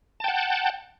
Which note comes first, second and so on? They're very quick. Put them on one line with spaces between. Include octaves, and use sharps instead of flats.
A5 G5 F#5